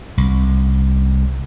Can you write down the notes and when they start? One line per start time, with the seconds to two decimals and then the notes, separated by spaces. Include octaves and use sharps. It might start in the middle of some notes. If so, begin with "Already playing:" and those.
0.17 C2